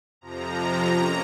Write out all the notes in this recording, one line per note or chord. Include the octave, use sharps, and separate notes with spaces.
F2 C3 F3 A#5
A#3 C#4